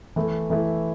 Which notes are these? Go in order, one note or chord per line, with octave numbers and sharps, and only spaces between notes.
E3 A3 E4
E3 A3 E4